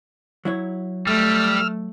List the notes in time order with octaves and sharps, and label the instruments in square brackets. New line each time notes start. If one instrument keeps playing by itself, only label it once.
[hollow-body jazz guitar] F#3 E4 C#5
[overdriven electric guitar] G3 [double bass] A3 [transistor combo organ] E6 F6